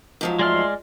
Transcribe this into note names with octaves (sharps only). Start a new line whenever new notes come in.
G#2 F3 F#3
D2 G#3 D5 E5 C6 F6